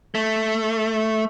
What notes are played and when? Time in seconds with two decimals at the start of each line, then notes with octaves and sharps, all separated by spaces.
0.15 A3